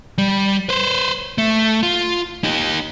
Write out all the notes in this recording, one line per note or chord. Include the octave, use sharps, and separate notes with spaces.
G3
B4 C5
A3
F4
D#4 G4